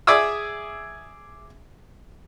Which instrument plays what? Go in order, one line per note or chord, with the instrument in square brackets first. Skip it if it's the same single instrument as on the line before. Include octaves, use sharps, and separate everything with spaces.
[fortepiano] G#4 D5 E5 G#5 D#6 E6